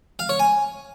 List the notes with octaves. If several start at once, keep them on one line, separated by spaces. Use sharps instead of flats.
F5
C#5
G#5